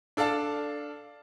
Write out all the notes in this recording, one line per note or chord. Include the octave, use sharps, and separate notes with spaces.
D4 A4 D5 F5 A5